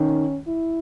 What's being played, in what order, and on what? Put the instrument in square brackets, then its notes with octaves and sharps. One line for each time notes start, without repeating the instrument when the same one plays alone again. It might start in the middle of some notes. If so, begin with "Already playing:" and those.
Already playing: [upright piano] D#3 [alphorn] C#4
[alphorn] E4